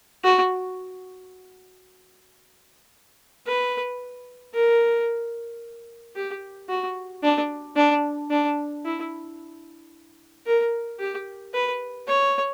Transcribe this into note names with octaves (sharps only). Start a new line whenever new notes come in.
F#4
B4
A#4
G4
F#4
D4
D4
D4
E4
A#4
G4
B4
C#5